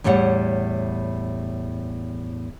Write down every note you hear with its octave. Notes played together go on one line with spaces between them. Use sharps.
E2 A2 G3 C#5 F#5